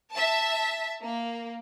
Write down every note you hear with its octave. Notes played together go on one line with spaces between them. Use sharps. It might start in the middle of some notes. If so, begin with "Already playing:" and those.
E5 A5
A#3